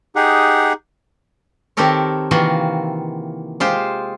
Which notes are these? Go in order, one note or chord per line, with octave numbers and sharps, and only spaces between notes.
D#4 G4 G#4 F#5
D#3 C4 G4 A4 A#4 C#5
C3 D#3 E3 A#3 F4 F#4
G#3 F4 G4 C5